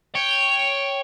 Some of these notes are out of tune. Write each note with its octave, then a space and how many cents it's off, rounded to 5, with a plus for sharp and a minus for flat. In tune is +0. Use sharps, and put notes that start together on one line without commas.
C#5 +0 G5 +0